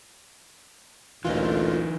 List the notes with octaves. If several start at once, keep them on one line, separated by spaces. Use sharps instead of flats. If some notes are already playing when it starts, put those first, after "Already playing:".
A1 D2 A#2 E3 D#4 F4